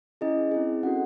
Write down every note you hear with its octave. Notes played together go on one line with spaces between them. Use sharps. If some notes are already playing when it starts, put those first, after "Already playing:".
C#4 E4 G#4 D#5
C4 E4 G#4
C#4 F#4 A4 F#5